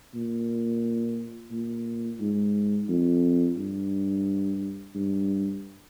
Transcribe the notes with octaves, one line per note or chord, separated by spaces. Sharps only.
A#2
A#2
G#2
F2
G2
G2